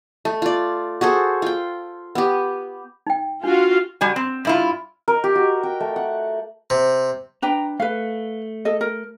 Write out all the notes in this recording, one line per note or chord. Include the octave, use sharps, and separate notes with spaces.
A3
F4 D5
F#4 G#4 A4 C5
F4 G5
B3 G4
D#4 G5
D4 F4 F#4 F5
G3 F#4 G#5
C4
G2 E4 F4
A#4
G4
F#4
G5
A3
F#5
C3
D4 B4 G5 A#5
A3 B4 F5
A4 D#5
A#4